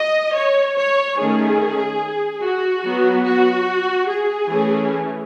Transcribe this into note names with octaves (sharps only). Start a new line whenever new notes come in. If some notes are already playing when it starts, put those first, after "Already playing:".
Already playing: D#5
C#5
C#5
D#3 A3 C#4 G#4
F#4
F#3 B3
F#4
G#4
E3 A3 C#4